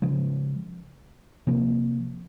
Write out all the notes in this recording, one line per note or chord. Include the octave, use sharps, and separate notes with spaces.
C#3 F3 G#3
C3 F3 A#3